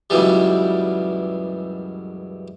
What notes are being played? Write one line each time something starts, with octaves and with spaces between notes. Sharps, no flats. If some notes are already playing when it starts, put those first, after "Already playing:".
C#2 F#2 B2 E3 G3